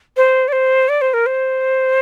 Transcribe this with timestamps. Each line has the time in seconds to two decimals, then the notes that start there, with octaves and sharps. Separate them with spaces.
0.17 C5
0.48 D5
0.53 C5
0.89 D5
1.01 C5
1.14 A#4
1.26 C5